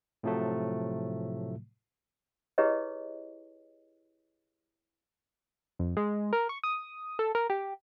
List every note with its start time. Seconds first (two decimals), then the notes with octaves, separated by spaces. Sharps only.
0.23 A2 C3 F3 F#3 A3
2.58 E4 G4 G#4 B4 C#5 D#5
5.79 F2
5.97 G#3
6.33 A#4
6.49 C#6
6.63 D#6
7.19 A4
7.35 A#4
7.50 G4